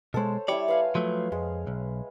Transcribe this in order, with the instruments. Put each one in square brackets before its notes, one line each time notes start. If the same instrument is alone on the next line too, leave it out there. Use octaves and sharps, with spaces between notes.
[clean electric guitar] B2 G#3 [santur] A4 C5 C#5
[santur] G3 E4 E5 [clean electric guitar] C#5 D5
[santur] B4 F5 G#5
[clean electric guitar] F3 F#3 A3
[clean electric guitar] F2 [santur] G#3
[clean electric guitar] B1